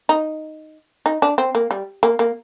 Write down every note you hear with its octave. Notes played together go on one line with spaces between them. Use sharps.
D#4
D#4
D4
C4
A#3
G3
A#3
A#3